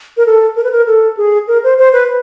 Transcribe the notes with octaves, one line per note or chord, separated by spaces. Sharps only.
A#4
A4
A#4
B4
A#4
A4
G#4
A#4
C5
C5
B4